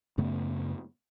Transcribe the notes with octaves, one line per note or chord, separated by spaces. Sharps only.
F#2 C#3 A3 B3